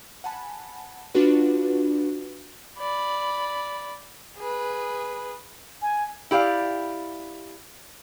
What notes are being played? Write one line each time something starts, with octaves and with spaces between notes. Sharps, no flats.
F#5 G#5 A5 B5
D4 F4 F#4 B4
D5 B5
G#4 B4
G#5
E4 G4 D5 F5